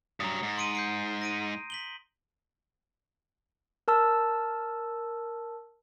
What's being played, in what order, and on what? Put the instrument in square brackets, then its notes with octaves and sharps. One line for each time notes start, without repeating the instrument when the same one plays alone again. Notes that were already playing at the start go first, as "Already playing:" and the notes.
[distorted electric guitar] G2 F#3 [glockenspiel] A#5 D#6
[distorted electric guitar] G#2
[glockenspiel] C6 D7 D#7
G6 C7 D7
A#6 D7 D#7
B6 F#7 G7
[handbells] A#4 A5 E6